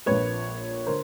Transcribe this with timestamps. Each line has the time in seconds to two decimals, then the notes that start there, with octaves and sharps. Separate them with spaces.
0.06 A#1 A#2 B4 C#5
0.86 D3 A#4 C5